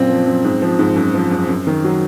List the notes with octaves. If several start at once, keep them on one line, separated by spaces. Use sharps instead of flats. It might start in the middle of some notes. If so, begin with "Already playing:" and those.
Already playing: F#2 A#2 C4
F3
F#2
G#2
F3
G#2
F#2
F3
F#2
F#2
D#3
F#3